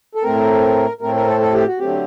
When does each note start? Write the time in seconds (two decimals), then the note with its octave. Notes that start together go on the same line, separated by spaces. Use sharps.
0.15 A4
0.23 A2 A3 C4 A#4
1.01 A2 A3 C4 A#4
1.15 A#4
1.27 A4
1.40 A4
1.53 G4
1.66 F#4
1.79 D3 F#3 A3 C4 G4